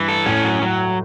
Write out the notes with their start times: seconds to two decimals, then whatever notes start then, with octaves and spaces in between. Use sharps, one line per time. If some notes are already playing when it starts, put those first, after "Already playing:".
Already playing: G2 E3
0.08 A4
0.26 A2 C#4
0.44 F#3
0.62 F#3